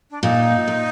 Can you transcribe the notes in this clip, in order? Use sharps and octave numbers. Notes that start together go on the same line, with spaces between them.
D4
A#2 D#4
A#2